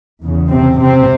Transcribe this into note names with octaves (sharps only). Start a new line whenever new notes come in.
E2 C#3
C3 C4
C3 C4